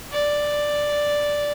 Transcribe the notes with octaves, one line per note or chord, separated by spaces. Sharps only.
D5